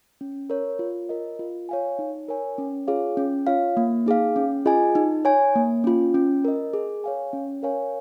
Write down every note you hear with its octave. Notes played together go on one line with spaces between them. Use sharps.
C#4
A#4 C#5
F4
A#4 D#5
F4
C#5 F5 G#5
D#4
A#4 C#5 G#5
C#4
F4 G#4 C#5 F5
C#4
F4 C#5 F5
A#3
D#4 G#4 F5
C#4
F4 G#4 D#5 G#5
D#4
C#5 G#5
A#3
C#4 F4
C#4
A#4 D#5
G#4
C#5 F5 G#5
C#4
A#4 C#5 F5 G#5